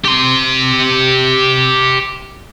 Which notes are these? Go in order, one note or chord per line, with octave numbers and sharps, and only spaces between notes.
G4 C6